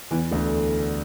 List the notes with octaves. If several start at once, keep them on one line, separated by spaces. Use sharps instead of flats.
E2 E3
D2 D3